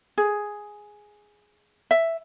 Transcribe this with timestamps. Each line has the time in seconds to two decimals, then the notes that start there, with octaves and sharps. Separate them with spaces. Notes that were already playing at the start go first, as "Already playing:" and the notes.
0.18 G#4
1.91 E5